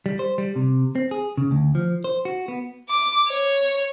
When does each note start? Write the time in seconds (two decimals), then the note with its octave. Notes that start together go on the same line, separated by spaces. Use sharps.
0.06 G3
0.19 C5
0.38 G3
0.56 C3
0.96 C4
1.11 G#4
1.37 C#3
1.51 D2
1.75 F3
2.04 C5
2.25 F#4
2.48 B3
2.89 D6
3.28 C#5